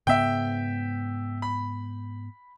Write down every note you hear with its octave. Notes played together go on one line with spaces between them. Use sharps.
G#2 C#3 B3 E5 G5
B5